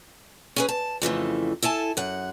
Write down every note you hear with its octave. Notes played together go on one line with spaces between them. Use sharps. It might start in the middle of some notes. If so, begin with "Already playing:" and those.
C#4 G#4 B4
A5
F2 C#3 E3 A3
E4 A4 G#5 A5
F#2 F#5